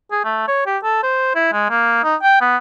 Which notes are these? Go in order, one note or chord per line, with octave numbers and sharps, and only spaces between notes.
G#4
A3
C#5
G4
A4
C5
E4
G#3
A#3
D#4
G5
B3